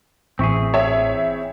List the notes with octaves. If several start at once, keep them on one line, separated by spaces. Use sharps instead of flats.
A1 C4 E4 G#4 C#6
C#5 E5